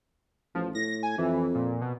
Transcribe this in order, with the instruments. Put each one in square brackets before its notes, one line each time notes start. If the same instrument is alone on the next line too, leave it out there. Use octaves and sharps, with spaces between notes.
[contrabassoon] A1 [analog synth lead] F3
[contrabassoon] A2 [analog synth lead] A#6
[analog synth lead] G#5
[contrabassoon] F2 [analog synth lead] E3
[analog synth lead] A#2
B2